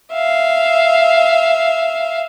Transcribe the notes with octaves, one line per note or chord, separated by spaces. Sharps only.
E5 F5